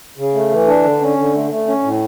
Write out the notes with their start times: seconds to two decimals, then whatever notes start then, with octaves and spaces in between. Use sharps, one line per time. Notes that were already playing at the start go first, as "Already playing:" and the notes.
0.18 C#3
0.34 A3
0.51 E3
0.67 D4
0.84 D3
1.01 C#4
1.17 D3
1.34 A3
1.51 A3
1.67 C#4
1.83 A2